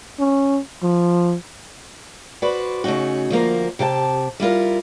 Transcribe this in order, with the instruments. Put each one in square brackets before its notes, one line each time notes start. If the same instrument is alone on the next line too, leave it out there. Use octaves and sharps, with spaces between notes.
[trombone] C#4
F3
[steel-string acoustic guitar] F#4 B4 C5 D5
C#3 A3 C#4 D#4 F#4
D2 F3 A#3 A#4
C3 G4 F5 A5
G3 E4 F4 A#4